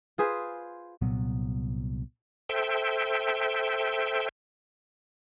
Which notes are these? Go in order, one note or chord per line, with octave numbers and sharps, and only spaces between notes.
F4 G#4 B4 C5
C2 A#2 F#3 B3
A4 C5 E5 G5